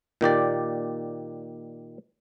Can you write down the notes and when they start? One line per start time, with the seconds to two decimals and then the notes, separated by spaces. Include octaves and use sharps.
0.21 A#2 D#3 G4 D5